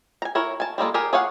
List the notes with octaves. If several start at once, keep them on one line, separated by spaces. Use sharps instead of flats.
G#5 A#5
E4 A#4 C#5
G#5 A5
G3 G#3 A#3 A4
G4 G#4 A#4 G#5
G#4 C#5 F5 F#5